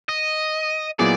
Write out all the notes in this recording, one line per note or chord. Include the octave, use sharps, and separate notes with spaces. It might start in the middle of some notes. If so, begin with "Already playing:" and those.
D#5
A#2 F#3 B3 E4 G#4 D5